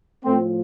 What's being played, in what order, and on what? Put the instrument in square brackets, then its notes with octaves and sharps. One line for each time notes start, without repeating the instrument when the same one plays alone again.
[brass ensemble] A2 F3 A3 C4